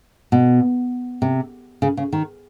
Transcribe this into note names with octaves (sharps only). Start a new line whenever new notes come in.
B2
C3
C#3
C#3
D#3